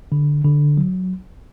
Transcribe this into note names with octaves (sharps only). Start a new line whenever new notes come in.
D3
D3
F#3